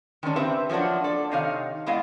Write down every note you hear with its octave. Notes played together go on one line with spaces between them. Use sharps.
D#3 G#3 C#4 D4
C4 G4 B4 E5
F3 F#3 A#3 D4 F#4
A4 D5
C3 D#3 D#4 C#5 F5
G#3 B3 E4 D5 D#5 F5